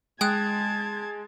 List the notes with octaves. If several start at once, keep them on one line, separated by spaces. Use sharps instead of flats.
G#3 G5 A5 D#6 F#6 G#6